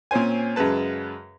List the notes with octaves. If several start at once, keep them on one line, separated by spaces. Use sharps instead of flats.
A#2 C4 C#4 C5 G#5
F#2 C#3 G#3 B4 A5